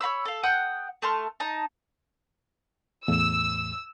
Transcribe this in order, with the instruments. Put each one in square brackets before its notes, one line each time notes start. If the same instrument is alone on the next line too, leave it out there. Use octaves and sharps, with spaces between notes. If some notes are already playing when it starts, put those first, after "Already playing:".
[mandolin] C#5 F5 B5 E6
A4 F5
F#5 G5 D#6 F#6
A3 A5 C6 F6
D#4 A5
[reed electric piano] E2 A2 [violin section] E6